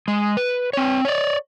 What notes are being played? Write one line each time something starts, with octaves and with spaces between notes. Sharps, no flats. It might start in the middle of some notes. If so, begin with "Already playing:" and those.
G#3
B4
C4 C#5
C#5 D5